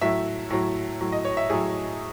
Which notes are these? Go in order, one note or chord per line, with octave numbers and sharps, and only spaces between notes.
A2 F#3 E5
A2 F#3
A2 F#3
D#5
C#5
E5
A2 F#3 G#4